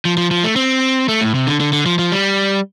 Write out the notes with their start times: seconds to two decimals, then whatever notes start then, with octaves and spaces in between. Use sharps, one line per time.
0.05 F3
0.17 F3
0.31 F3
0.44 A3
0.56 C4
1.09 A3
1.21 A2
1.34 C3
1.47 D3
1.60 D3
1.73 D3
1.86 F3
1.99 F3
2.12 G3